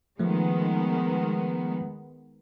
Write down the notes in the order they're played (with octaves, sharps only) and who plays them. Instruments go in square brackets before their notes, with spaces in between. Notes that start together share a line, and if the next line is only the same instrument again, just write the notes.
[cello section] D#3 G#3 B3 [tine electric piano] F3 A3